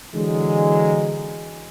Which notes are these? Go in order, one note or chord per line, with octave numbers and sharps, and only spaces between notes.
D3 E3 F#3 G#3